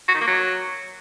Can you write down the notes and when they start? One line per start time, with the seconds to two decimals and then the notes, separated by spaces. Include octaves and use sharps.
0.08 F#4
0.15 D#3
0.21 A#3
0.27 F#3